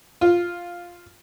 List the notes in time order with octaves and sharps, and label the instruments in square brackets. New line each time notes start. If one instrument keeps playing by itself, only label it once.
[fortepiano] F4